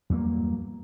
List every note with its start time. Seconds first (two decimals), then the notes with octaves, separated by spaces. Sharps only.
0.10 E2 G2 F#3 A#3